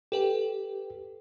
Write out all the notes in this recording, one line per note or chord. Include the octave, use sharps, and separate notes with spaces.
G4 A4 B4 G5